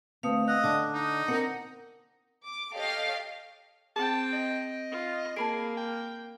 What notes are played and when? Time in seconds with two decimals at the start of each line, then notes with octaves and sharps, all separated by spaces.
0.23 D2 A3 C4 B4 F5 D#6
0.48 D#5 F5 F#5 E6 F#6
0.64 D3 A5 D6 D#6
0.93 D#4
1.28 C4 A#4 F#5 A#6 C#7
2.44 D6
2.73 G4 A4 C#5 D#5 F5
3.96 C4 G#4 G5 A5
4.33 D#5
4.91 F4
5.36 A#3 G#4 A5 B5 D7
5.77 G5